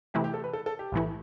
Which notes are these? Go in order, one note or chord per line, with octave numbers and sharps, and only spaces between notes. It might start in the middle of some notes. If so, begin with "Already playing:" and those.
C3 E3 A3 E4 G4
G4
A4
B4
A4
A4
G4
B1 A2 E3 A3 E4